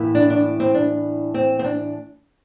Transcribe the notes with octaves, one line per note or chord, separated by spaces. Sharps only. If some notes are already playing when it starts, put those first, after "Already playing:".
Already playing: A2 E3 A#3
D4
D4
C4
D4
C4
C4
D4